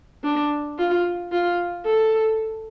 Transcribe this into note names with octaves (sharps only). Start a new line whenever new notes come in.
D4
F4
F4
A4